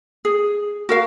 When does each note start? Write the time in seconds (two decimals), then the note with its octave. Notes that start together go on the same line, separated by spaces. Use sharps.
0.25 G#4
0.89 F#4 A#4 F5